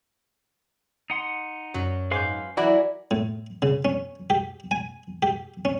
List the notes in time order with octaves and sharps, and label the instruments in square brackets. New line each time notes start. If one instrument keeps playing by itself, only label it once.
[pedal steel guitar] D#4 F#5 C6
[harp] F#2 [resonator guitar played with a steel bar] F#3
[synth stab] G#2 [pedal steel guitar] B4 F5 C6 [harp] G#5 D6 G6
[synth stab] E3 E4 [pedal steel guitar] F#3 [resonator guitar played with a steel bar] F#4 A#4 D5
[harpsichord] A2
C#3
C#4
G4
G#5
G4
C#4